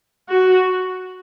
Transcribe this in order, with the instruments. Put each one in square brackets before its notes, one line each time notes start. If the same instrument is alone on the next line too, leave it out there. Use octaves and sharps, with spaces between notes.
[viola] F#4